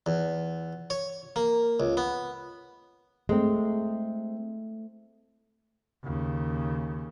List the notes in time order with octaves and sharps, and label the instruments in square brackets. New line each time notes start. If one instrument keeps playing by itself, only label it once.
[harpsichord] E2
C#5
A#3
C#2
B3
[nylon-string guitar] G#3 C4 [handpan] A3
[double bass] D#2 C#3